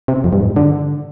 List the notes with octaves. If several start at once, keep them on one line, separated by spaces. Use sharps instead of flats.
C3
F2
G2
G#2
D3